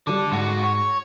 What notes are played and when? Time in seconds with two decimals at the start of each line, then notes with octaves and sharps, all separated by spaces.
0.07 D3 F3 G3 A4 D5
0.32 C#2 G#2 F#4
0.63 C#5